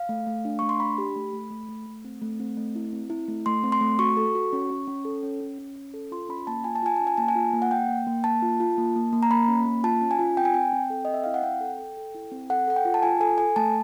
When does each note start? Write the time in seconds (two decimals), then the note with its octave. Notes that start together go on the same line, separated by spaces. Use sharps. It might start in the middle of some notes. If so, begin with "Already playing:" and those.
Already playing: F5
0.09 A3
0.27 A3
0.45 D4
0.59 A3 C#6
0.69 C6
0.80 D4 B5
0.98 G4
1.16 A3
1.33 A3
1.50 A3
1.69 A3
1.86 A3
2.05 C4
2.21 A3
2.40 C4
2.57 A3
2.75 E4
2.92 C4
3.10 E4
3.28 A3
3.46 A3 C6
3.64 C4
3.72 C6
3.81 A3
3.99 F#4 C#6
4.17 A4
4.35 F#4
4.53 C#4
4.70 C#4
4.87 C#4
5.05 A4
5.23 C#4
5.40 C#4
5.58 C#4
5.76 C#4
5.94 A4
6.12 F4 C6
6.29 C#4 B5
6.47 A#3 A5
6.64 F4 G#5
6.76 A5
6.83 F4 G#5
6.96 C#4 A5
7.07 G#5
7.17 A#3 A5
7.28 G#5
7.36 F4
7.53 A#3
7.62 F#5
7.71 A#3 G5
7.89 A#3
8.07 A#3
8.24 A#3 A5
8.42 F4
8.60 F4
8.78 A#3
8.96 A#3
9.13 A#3
9.23 A#5
9.30 A#3 B5
9.49 C#4
9.66 A#3
9.84 F4 A5
10.01 C#4
10.11 G#5
10.19 F4
10.37 C4 G5
10.45 G#5
10.54 C4 G5
10.73 C4
10.90 A4
11.05 C4 D#5
11.14 E5
11.24 E4 F5
11.34 F#5
11.43 C4 G5
11.61 A4
11.78 A4
11.97 A4
12.15 E4
12.32 C4
12.50 A4 F#5
12.67 A4 F#5
12.76 G5
12.85 F4
12.94 A5
13.03 F4 G#5
13.20 A4 G#5
13.38 A4 G#5
13.56 A3 A5